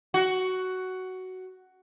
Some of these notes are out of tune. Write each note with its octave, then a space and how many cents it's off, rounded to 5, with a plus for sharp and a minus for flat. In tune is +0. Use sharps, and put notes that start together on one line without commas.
F#4 +10